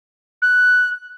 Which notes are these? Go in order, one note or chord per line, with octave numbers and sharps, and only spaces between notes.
F#6